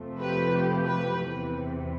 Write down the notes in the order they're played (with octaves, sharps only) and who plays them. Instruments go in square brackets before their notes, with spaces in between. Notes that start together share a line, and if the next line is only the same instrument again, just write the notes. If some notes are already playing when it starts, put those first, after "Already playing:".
Already playing: [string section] F2 C3 F3 A3
G4 B4
G4
G4 B4
E2 C3 E3